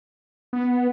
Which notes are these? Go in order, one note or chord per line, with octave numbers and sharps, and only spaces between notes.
B3